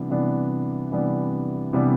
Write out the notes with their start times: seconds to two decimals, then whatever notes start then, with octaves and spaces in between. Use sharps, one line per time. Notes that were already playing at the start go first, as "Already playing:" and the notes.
Already playing: C3 E3 G3 B3 D4
0.10 C3 E3 G3 B3 D4
0.91 C3 E3 G3 B3 D4
1.73 C3 E3 G3 B3 D4